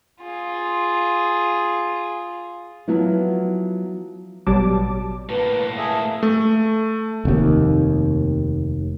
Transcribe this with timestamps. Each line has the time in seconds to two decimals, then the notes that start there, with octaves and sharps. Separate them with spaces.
0.22 F4 G#4
2.88 F3 F#3 B3 E4
4.47 A1 B2 F#3 G3 A5 D6
5.30 A2 A#3 B4
5.78 G#4 E5 A5
6.23 A3
7.25 F1 D#2